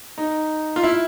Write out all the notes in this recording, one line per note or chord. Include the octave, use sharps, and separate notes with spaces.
D#4
F4
E4